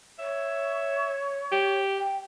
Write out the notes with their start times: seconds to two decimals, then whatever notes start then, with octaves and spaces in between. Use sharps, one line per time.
0.19 C#5 E5
1.52 G4
1.98 G5